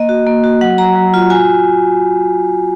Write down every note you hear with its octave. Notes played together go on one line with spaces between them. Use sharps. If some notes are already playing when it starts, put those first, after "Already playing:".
Already playing: A#3 D#5
F#4
A#3
F#4
F#3 F#5
F#3 A#5
F#3
F4
F#4 G#5